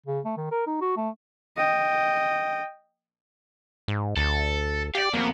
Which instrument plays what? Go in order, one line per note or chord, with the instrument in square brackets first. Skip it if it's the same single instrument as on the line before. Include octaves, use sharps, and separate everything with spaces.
[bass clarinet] C#3
A3
D#3
A#4
D#4
F#4
A3
[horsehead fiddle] D#5 G5
[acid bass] G#2
[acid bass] D2 [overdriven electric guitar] A4
[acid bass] G4 [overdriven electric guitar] D5 F5
[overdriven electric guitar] F2 B3 [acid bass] A#3